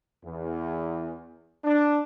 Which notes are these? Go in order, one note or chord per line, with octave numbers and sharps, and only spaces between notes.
E2
D4